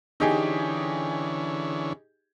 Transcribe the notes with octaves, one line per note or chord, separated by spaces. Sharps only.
D3 E3 C#4 D#4 G4 G#4